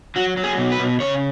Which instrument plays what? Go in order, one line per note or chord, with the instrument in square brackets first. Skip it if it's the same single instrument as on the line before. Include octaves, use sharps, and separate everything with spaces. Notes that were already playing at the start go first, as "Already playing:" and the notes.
[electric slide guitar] F#3 F#4
F#3
G#4
B2
B4
B2
C#3 C#5